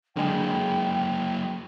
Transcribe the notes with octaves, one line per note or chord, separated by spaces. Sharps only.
D3 F#3 G#3 A#3 G5